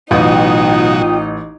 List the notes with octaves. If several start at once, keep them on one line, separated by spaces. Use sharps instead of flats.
A1 B2 F#3 D#4 F4 F#4 G5 D#6